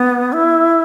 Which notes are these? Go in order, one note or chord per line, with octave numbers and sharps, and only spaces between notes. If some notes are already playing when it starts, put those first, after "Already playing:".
Already playing: B3
E4